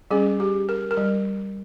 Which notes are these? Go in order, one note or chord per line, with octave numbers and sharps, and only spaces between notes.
G3 C#4 G#4
G4
A#4
A#4
G3